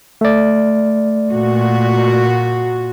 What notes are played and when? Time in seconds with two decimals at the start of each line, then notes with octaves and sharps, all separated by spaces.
0.21 A3 D5
1.32 A#2 F#4